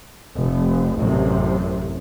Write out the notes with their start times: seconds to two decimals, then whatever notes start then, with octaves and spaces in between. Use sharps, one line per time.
0.34 F1
0.98 A1 F#2 C3